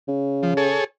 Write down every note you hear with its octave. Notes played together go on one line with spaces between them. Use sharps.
C#3
F3
G#4 A4 C#5